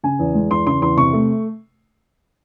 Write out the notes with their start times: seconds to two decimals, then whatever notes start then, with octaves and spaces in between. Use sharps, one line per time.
0.03 C#3 G#5
0.19 E2
0.34 G#3
0.50 E2 C6
0.66 C#3 C6
0.82 E2 C6
0.97 C3 C#6
1.13 A3